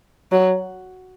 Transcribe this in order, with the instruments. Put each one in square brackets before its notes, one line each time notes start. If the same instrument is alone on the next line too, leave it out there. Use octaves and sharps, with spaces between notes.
[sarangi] F#3